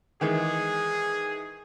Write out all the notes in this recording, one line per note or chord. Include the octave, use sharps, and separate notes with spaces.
D#3 E3 G#3 G#4